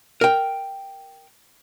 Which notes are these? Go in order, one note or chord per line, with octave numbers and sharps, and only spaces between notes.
A#4 G5